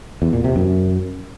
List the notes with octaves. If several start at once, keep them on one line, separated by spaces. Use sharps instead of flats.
E2
A#2
C3
F#2